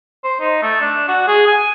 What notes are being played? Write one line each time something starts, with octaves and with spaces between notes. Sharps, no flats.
C5
D#4
A3
D4
F#4
G#4
G#5